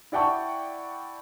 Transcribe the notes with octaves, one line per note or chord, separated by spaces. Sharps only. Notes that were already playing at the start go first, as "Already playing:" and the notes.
E4 D5 F#5 G5 A5 C#6